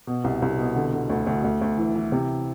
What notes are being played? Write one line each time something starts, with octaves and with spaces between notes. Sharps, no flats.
B2
C2
C2
B2
D3
D3
D2
D2
D2
D2
E3
E3
C3